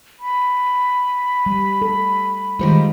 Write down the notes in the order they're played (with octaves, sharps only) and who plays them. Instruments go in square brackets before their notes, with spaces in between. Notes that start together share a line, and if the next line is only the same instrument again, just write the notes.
[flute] B5
[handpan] G3
A4
[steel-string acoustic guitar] D#3 G3 F4 [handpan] G#3 C5